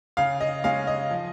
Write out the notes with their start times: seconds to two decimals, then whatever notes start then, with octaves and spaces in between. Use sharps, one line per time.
0.17 C#3 F5
0.40 D#5
0.64 G#3 C#4 F5
0.87 D#5
1.11 F3